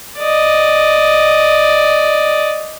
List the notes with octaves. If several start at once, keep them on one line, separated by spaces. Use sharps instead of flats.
D5 D#5